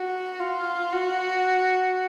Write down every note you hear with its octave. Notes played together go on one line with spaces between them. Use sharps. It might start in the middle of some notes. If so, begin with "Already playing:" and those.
Already playing: F#4
F4
F#4